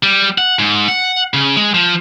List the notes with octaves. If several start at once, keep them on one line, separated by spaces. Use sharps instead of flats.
G3
F#5
G#2
F#5
C#3
G#3
F3